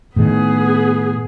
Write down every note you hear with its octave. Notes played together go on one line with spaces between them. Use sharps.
A2 D#3 B3 G#4